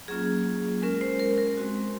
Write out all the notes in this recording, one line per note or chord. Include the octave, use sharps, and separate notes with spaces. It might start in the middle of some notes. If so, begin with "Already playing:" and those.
F#3 A#3 C#4 F4 G#4
G#3 C#4 F4 A#4
C5
A#4
A#4
G#3 C4 F#4